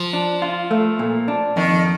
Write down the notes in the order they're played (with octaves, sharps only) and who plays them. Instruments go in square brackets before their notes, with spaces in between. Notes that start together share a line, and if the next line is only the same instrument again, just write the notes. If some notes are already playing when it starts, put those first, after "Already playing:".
Already playing: [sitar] F3
[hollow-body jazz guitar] D4
F4
A3
A#2
D4
[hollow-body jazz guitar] F2 [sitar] D#3